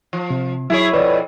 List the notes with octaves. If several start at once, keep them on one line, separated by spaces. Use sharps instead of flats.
F3
C3
F#3 E4 G#4 C#5
F2 B2 B4 C#5 D5